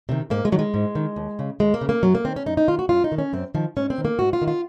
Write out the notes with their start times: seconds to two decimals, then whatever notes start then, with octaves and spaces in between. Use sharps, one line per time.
0.09 C3 D#3
0.30 G#2 A#3
0.45 G#3
0.52 D#3 F#3
0.59 G#3
0.74 G#2
0.95 D#3
1.16 D#2
1.39 C#3
1.60 D#2 G#3
1.74 A#3
1.81 C#3
1.89 A#3
2.03 F#2 F#3
2.15 A#3
2.25 D#3 C4
2.36 C#4
2.46 F#2 D#4
2.57 D#4
2.68 D#3 F4
2.79 F#4
2.89 F#2 F4
3.04 D#4
3.12 D#3
3.18 C#4
3.33 F#2 C4
3.54 D#3 F3
3.76 G#2 C#4
3.90 C4
3.98 D#3
4.05 A#3
4.19 G#2 F#4
4.33 F4
4.42 D#3
4.48 F4